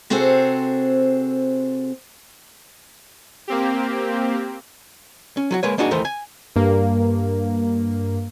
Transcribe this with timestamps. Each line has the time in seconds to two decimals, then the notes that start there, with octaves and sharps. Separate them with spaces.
0.10 C3 C4 F#4 G#4 A4 C5
3.48 A#3 C4 G4
5.37 C#4
5.51 F#3 F4 F#4
5.63 G#3 A#3 B4 C#5
5.78 A#3 D4 D#4 F#4 G#4
5.91 D#2 E3 A3 A#4 C5
6.05 G#5
6.56 G2 A#3